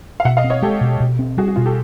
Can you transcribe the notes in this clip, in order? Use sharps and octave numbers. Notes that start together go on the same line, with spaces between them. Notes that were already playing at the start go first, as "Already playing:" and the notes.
F5
B2 E5 F#5
D#5 F5
C4
C#5 D#5
G#3 G4 A4
B2
B2
C4
G3 F#4 G#4
F#4
B2 F4
G4 A4